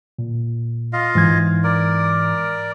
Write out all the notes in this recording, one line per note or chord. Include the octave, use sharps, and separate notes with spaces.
A#2
F4 D#5 F5
G#2 E3 G#6
A#4 D5